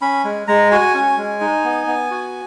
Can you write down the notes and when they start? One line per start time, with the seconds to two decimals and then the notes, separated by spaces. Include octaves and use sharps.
0.01 C#4 B5
0.24 G#3
0.48 G#3 A#5
0.71 F#4 G#5
0.94 C#4
1.17 G#3
1.41 D#4
1.64 B3
1.87 B3
2.11 F#4